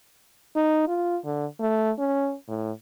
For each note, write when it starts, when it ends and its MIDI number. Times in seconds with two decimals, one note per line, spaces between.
0.56 0.83 63
0.88 1.17 65
1.24 1.46 50
1.60 1.91 57
1.99 2.35 61
2.48 2.71 45